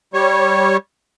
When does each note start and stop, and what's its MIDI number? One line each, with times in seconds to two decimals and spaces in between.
0.14 0.77 55
0.14 0.77 73